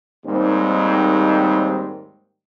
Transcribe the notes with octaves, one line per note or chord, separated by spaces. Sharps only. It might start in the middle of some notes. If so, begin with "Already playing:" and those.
D#2 G#2 D#3 G3 C4